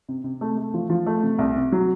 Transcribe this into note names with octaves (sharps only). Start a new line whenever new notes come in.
C3
C3
A3
A3
F3
F3
A3
C3
C2
C3
F#3